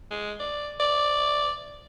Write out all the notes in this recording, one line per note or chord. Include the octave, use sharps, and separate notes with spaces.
G#3
D5
D5